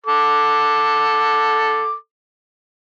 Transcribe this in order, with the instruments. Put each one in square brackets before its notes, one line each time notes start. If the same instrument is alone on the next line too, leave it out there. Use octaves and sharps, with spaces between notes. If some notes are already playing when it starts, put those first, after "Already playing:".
[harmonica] A4 D6